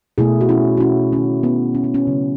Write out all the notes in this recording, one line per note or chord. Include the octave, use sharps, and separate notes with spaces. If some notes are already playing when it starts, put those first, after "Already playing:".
B2 A3 E4 G#4
F#4
C#4 E4
F#4
C#4 E4
D#3 A3 C#4
B3
C#4
B3
C#4
C#3 F#3 A3